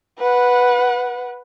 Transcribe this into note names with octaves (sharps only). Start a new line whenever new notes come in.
B4 F#5